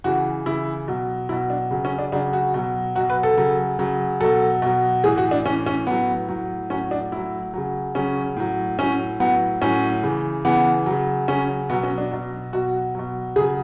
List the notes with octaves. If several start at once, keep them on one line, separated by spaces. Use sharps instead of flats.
C#3 E3 F#4
C#3 E3 E4
B2 F#3
B2 F#3 E4
D4
C#3 F#3
C#4
D4
C#3 F#3 D4
F#4
B2 F#3
B2 F#3 F#4
B4
A4
C#3 F#3
C#3 F#3
B2 F#3 A4
B2 F#3
A2 E3 G#4
F#4
D4
A2 E3 C#4
C#4
A2 F#3 B3
A2 F#3
A2 F#3 C#4
D4
A2 F#3 E4
C#3 F#3
C#3 F#3 C#4
A2 F#3
A2 F#3 C#4
A2 F#3 B3
A2 F#3 C#4
C#3 E3
C#3 E3 B3
C#3 F#3
C#3 F#3 C#4
B2 F#3 B3
C#4
D4
B2 F#3
B2 F#3 F#4
B2 F#3
C#3 F#3 G#4